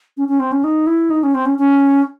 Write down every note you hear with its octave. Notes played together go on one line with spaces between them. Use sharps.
C#4
C#4
C4
C#4
D#4
E4
D#4
C#4
C4
C#4
C#4